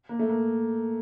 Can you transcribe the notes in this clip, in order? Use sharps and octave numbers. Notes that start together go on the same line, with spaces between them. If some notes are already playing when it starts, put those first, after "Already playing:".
A#3
A3
A#3